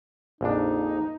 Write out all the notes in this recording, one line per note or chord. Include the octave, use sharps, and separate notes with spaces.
A#1 F2 D4 D#4